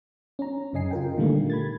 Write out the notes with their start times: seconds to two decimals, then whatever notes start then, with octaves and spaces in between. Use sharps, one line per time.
0.39 C#4 A#5
0.73 F#2 C#3 C#4 D#5 G#5 C7
0.91 F4 A#4 G5
1.17 A#2 D3 D#3 G3 A3 A#3
1.50 B5 G#6 A6